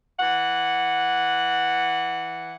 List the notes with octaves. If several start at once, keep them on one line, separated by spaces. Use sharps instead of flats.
E3 F#5